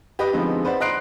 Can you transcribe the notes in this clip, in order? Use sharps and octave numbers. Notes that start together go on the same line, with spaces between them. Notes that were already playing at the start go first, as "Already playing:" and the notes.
G4 B4 D#5
D3 F3 G#3 B3 C4 D#4
B4 C5 D5 F#5
D#5 A#5 C6 F#6 C7 D7